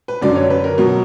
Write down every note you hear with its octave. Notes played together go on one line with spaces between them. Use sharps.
B4
F#2 D3 F#3 D5
C#5
B4
A#4
B2 F#3